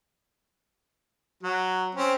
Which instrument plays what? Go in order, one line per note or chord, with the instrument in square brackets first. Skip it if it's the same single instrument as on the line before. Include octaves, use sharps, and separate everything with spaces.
[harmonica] F#3
C4 C#4